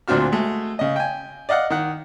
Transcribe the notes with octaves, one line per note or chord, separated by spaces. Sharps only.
D2 A#2 C4 D4 F#4 F6
G#3 A3 F#4
C#3 D#5
G5 G#5
D5 D#5 F5 F#5
D#3 F#5